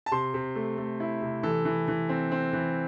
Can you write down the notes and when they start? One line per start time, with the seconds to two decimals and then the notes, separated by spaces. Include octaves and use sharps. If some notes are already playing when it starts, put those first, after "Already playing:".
0.06 A5
0.11 C3 C6
0.34 C3
0.55 A3
0.78 A3
1.00 E4
1.22 C3
1.43 E3 A4
1.65 E3
1.88 E3
2.09 C4
2.32 C4
2.53 E3